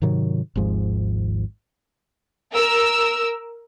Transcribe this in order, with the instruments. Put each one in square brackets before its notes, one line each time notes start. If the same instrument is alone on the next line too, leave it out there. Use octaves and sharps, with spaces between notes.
[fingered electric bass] G#2 C3 D#3 F#3
G#1 D#2 G#2 F3
[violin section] A#4 E6